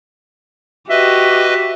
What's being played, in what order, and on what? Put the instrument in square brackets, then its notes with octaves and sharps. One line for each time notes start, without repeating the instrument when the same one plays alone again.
[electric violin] F#4 G4 [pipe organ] B4 D#5 [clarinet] E5